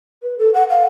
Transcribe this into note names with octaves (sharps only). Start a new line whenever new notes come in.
B4
A4
F#5
F5